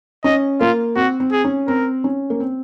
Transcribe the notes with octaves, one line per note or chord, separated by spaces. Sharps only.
C#4 D#5
A#3 F4
C4 F#4
C4
G#4
C#4
C4 A#4
C#4
A#3
C4